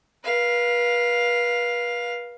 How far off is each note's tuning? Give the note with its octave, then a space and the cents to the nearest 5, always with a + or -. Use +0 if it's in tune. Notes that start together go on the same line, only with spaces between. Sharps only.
B4 -35 F5 +0